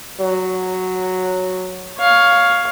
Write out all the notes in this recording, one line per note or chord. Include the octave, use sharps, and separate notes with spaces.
F#3
C#5 F5